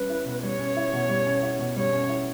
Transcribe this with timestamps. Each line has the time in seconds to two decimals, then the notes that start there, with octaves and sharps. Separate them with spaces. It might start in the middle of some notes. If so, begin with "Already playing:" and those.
Already playing: G3 C#4 B4
0.10 E4
0.26 B2
0.43 G3 C#5
0.59 C#4
0.76 E4
0.93 B2
1.09 G3
1.26 C#4
1.42 E4
1.59 B2
1.76 G3 C#5
1.93 C#4
2.09 E4